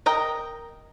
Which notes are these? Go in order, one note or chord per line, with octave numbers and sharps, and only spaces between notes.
A#4 D#5 G5 A#5